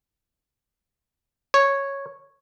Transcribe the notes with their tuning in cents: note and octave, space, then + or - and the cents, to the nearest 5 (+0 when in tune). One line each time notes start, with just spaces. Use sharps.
C#5 -5